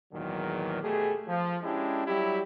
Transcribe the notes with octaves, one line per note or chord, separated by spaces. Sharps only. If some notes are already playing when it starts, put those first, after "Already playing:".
G#1 E2 A#2 D#3 F#3
B2 A3 G4 G#4
F3
G#3 C#4 D4 E4 G4
F#3 G3 E4 G4